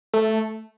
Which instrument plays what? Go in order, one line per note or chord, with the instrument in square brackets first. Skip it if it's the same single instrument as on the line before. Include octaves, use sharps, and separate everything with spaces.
[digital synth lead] A3